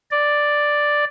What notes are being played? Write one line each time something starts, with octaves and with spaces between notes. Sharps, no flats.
D5